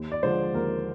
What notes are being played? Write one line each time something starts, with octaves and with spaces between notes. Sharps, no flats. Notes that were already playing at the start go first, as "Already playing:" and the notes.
Already playing: D#2
D5
D3 F3 G#3 C5
D#2 A#4